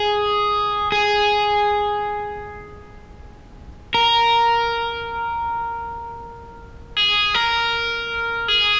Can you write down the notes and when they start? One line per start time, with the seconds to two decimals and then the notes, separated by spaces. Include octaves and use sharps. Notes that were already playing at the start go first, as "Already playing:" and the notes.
Already playing: G#4
0.92 G#4
3.94 A#4
6.97 G#4
7.34 A#4
8.48 G#4